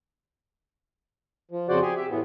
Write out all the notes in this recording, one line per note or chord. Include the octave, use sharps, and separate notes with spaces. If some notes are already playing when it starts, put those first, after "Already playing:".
F3
F2 C#3 F#4 C5 D5 F#5
G4 G#4 G#5
G4 E5
A2 E3 B3